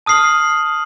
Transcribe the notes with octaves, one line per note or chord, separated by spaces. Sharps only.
A5 D#6 F6 C7 F#7